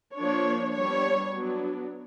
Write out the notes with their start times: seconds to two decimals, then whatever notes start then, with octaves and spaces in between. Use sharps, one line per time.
0.17 F3 A#3 D4 C#5
0.75 G3 B3 D4 C#5
1.33 F#3 B3 D4